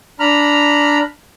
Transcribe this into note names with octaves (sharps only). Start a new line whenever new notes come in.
D4 A#5 B5 F6